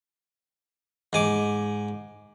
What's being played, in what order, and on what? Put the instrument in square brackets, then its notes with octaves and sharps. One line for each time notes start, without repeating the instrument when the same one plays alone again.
[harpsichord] G#2 G#5 D6